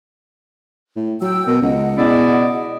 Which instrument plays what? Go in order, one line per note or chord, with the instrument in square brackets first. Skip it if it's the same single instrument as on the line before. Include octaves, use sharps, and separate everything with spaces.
[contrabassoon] A2
[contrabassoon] F#3 [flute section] G5 E6
[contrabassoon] B2 [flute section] A#4
[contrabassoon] C#2 [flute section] D#5 F#5
[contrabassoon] B2 [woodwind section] E4 G#4 D5